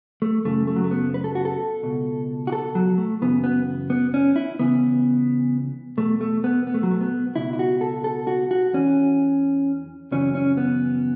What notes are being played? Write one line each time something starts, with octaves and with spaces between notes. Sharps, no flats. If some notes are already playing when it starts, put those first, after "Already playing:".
A3
F#2 C#3 E3 A3
A3
F#3
A3
B3
B4
A4
F#4
A4
C#2 B2
F#4
A4
F#3
A3
F#2 C#3 E3 B3
B3
B3
C#4
E4
C#2 C#3 E3 B3
E2 B2 A3
A3
B3
B3
A3
F#3
A3
B3
C#2 B2 E4
E4
F#4
A4
A4
F#4
F#4
E2 E3 C#4
F#2 C#3 E3 C#4
C#4
B3